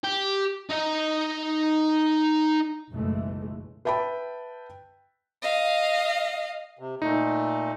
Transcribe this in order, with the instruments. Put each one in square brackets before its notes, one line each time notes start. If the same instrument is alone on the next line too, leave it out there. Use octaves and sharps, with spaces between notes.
[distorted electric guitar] G4
D#4 D#5
[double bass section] F#1 B1 E3 G#3 A3
[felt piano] B4 E5 G5 A5 B5
[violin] D#5 F5
[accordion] C3
[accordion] A#2 A3 [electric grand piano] D#4